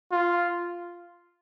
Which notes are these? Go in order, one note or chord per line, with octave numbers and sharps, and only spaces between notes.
F4